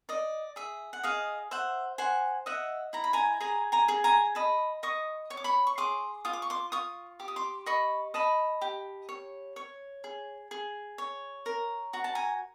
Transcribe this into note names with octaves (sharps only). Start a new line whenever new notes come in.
D5 D#5
G#4 E5
F#5
G#4 D#5 F5
C5 E5 F#5
C5 F#5 G#5
D#5 E5 F#5
E4 A#5
B5
G#5 A#5
G#4 G#5 A#5
G#5 A#5
G#4
G#5 A#5
D#5 A5 B5
D#5 C#6 D#6
C#5 C#6
D6
B5 C#6
C#6
G#4 C6 D6
F4 D#6
D6
C#6
C6 D6
F4 C#6 D#6
G4 D6
D#6
C6 D6
D#5 B5 C#6
D#5 A5 B5
G4
C#5
C#5
G#4
G#4
C#5
A#4
F#4 A#5
A5
G#5 A#5